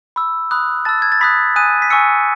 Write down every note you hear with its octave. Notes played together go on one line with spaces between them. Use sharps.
B5 E6
B5 D#6 F#6
A5 E6 A6
G#6
A6
B5 D#6 F#6 B6
G#5 D#6 F#6 D#7
B6
G#5 C#6 E6 C#7